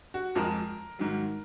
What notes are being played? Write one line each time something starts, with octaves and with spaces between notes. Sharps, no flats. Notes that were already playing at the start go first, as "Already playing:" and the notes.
F#4
F2 F3 G#3 A#4
G#2 D#3 F#3